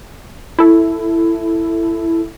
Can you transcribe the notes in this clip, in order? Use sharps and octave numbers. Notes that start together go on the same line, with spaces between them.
E4 A4